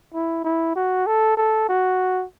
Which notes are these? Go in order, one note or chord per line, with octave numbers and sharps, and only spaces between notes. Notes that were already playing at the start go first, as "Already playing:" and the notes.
E4
E4
F#4
A4
A4
F#4